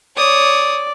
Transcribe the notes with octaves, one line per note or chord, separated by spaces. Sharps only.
C#5 D5 D#6